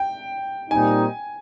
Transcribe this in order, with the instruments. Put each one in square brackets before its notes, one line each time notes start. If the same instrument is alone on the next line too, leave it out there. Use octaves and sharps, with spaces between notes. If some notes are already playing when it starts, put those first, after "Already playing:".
Already playing: [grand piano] G5
[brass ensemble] A#2 G3 C4 D#4 [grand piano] G#5